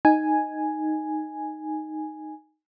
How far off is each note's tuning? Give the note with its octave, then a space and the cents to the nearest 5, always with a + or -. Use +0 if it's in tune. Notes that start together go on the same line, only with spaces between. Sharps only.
D#4 +0 G#5 +0